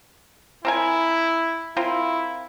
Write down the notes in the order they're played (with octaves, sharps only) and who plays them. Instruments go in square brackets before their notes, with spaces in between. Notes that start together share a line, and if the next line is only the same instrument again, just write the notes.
[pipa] C4 A#4 G#5 [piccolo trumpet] E4
[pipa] C4 F4 A#4 [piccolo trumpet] E4